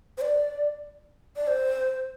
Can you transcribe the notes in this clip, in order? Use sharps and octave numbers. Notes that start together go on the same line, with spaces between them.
C5
D5
D5
C5